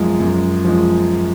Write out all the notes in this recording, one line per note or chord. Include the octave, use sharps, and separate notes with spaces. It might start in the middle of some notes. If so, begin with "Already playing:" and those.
Already playing: F#2 F3 G#3
F#2
F3 G#3